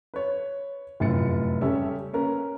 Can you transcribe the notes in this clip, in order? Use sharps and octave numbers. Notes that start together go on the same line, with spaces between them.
B4 C#5
F1 F#2 A2 F4 A6 C#7
C#3 G3 C#4 A4 E5
A#3 C#4 A#4 B4